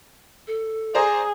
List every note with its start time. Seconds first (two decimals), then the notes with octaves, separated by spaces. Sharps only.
0.47 A4
0.95 G#4 C5 D5 A#5